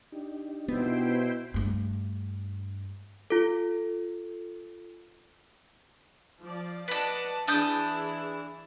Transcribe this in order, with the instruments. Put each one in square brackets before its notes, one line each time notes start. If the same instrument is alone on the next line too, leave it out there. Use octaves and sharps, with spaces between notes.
[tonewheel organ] D4 D#4 G4
[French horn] B2 [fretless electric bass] B3 [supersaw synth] E4 C5 G5
[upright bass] G2 A3
[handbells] F4 A4
[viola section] F3 D5
[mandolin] B4 D5 [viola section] D#5 F#5 A5
[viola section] E3 E4 G#4 [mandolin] D4 D#6 G6